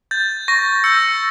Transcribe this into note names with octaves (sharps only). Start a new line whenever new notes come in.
G6 A6
C#6 A#6
E6 G6 C#7